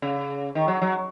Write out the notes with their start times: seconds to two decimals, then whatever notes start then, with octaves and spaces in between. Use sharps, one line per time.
0.02 C#3
0.55 D#3
0.68 F#3
0.81 F#3